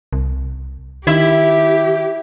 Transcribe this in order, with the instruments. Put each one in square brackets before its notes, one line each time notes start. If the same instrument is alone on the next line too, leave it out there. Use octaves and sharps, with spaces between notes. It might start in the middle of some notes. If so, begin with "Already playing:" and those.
[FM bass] C2
[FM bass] D#3 [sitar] E4 [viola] G4